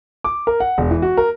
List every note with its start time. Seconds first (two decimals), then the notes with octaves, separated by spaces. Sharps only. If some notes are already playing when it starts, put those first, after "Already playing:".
0.24 D6
0.47 A#4
0.60 F#5
0.78 E1
0.91 E3
1.02 F#4
1.17 A#4